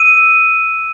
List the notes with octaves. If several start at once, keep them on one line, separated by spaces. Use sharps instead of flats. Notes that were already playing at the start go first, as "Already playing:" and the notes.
Already playing: E6 D#7